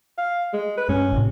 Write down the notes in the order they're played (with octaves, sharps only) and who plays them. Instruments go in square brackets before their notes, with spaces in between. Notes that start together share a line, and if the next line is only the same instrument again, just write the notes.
[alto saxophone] F5
G#3
B4
[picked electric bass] G2 G#3 [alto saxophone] C#4
[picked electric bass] G#1 A2 C3